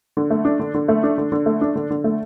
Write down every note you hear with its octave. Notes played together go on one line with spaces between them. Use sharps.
D3
A3
D4
D3
D3
A3
D4
D3
D3
A3
D4
D3
D3
A3